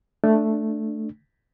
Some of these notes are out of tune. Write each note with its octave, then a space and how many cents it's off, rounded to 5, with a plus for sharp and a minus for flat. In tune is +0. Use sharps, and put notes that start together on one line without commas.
A3 +0 D4 +10